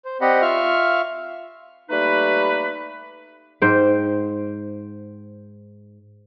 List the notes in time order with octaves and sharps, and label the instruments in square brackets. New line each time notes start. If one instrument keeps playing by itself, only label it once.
[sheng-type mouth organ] C5
C4 G4 D5 D#5 F#5 B5
F4 E5 F5 C#6 F6
[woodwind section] G3 A3 A#3 D#4 B4
[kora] G#2 C5 G5